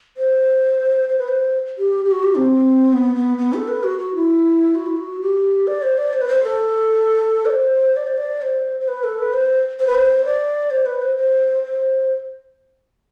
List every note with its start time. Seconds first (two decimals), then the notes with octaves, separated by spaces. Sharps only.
0.17 C5
1.09 C5
1.19 B4
1.28 C5
1.78 G4
2.05 G4
2.12 F#4
2.23 G4
2.35 C4
2.93 B3
3.15 B3
3.38 B3
3.54 A4
3.68 B4
3.84 F#4
3.99 F#4
4.15 E4
4.75 F#4
4.86 E4
4.96 F#4
5.21 G4
5.67 D5
5.82 C5
5.98 D5
6.13 C5
6.21 B4
6.28 C5
6.43 A4
7.46 D5
7.50 C5
7.96 D5
8.07 C5
8.17 D5
8.42 C5
8.80 C5
8.88 B4
9.04 A4
9.19 B4
9.33 C5
9.79 C5
9.87 B4
9.95 C5
10.25 D5
10.71 C5
10.86 B4
11.02 C5
11.17 C5
11.63 C5